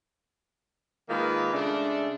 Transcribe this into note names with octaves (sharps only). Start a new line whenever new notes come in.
D#3 G#3 A#3 F4 B4
C#3 G#3 A3 D4